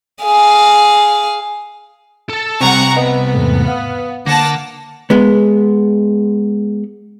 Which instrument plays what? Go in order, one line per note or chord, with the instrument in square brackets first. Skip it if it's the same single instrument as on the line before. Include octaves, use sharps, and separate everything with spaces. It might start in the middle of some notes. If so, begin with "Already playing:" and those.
[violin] G#4 F5
[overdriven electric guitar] A4 A5
[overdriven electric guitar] C2 [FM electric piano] G3 C4 [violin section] F#5 A#5 C#6
[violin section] B3 [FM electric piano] B4 D#5 F#5
[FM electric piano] E2 G#2 A3
F5 F#5 D#6
[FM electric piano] D3 [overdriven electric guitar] A#3 [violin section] F#5 A5 A#6
[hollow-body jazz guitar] G#3 B3